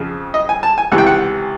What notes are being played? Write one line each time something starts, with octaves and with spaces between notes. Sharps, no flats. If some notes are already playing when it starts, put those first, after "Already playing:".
Already playing: F2 C#3 F3
D#5
G#5
A5
G#5
C#2 C3 E3 F#5
G5
F#5